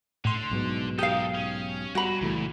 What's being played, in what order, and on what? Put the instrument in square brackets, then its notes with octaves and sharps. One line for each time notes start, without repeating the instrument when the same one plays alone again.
[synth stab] A2 C6 [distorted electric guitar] D3
[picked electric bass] B1 G#2 B2
[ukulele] G4 F5 [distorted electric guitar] A4 A#4 [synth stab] D#6
[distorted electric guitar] C#4
[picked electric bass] G3 [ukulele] F#4 B5 [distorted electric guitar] F#5 A#5
[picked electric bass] C#2 E3 A3 [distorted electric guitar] A#2